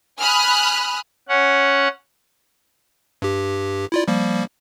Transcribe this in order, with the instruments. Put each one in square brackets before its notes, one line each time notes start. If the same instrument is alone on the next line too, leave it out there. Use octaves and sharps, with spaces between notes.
[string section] G#5 B5 D#6 F6 F#6
[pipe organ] C#4 F#5
[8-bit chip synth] G2 G4
E4 F4 D5
F3 G3 A#3